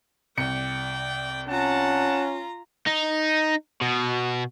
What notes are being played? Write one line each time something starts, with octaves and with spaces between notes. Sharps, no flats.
C2 D5 G5 C#7
C#4 F4 F#5 A5 A#5
D#4
B2